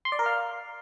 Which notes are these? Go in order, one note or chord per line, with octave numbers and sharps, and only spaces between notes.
C6
D5
A#4
F5